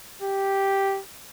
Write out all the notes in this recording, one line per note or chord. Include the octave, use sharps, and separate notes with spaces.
G4